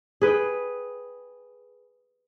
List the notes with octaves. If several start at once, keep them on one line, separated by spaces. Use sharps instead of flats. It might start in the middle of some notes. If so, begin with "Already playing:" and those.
G#4 B4 G5